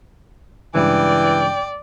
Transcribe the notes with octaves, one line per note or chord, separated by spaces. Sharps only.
G2 C#3 E3 G#3 D5 G5